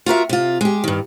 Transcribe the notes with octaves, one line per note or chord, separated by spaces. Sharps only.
F4 F#4 A#4 E5
C3 F4
G#3 G4
G2 D#3